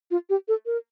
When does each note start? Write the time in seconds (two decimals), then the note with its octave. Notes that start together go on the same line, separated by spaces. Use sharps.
0.11 F4
0.30 G4
0.48 A4
0.66 A#4